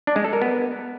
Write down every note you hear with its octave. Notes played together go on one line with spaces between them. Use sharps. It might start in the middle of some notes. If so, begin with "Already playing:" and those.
D4
G#3
A4
A#4
B3